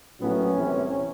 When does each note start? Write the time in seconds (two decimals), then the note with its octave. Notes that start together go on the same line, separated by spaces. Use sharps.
0.19 A#1 A2 F#3 B3 C#4
0.56 C2 C3 E3